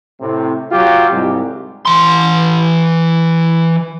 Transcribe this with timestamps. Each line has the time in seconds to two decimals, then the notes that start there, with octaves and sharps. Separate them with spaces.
0.21 A2 C3
0.72 F#3 F4 G4
1.10 C2 G#2
1.86 E3 C6